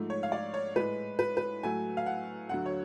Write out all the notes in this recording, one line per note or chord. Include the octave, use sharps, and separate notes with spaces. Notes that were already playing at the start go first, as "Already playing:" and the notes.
Already playing: G#2 F3 A3
C#5
F5
D5
C#5
A2 G#3 B4
B4
B4
A2 F#3 A3 G#5
F5
F#5
D2 D3 F#3 F#5
C#5